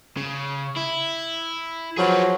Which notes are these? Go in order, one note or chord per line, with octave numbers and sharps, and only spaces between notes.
C#3
E4
F3 F#3 G#4 B4